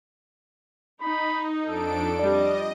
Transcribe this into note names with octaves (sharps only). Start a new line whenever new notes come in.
D#4 B5
F2 D4 A4 D7
G3 D4 D#5